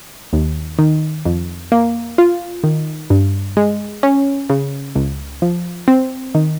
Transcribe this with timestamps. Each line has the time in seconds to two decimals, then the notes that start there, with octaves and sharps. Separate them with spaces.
0.33 D#2
0.79 D#3
1.25 F2
1.72 A#3
2.18 F4
2.64 D#3
3.10 G2
3.57 G#3
4.03 C#4
4.50 C#3
4.95 C#2
5.42 F3
5.88 C4
6.35 D#3